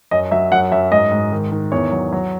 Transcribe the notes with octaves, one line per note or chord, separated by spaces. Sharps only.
F#2 D#5
F#3 E5
F#2 F#5
F#2 E5
G#2 D#5
G#2
D#3
D#3
E2 C#5
F#3
F#3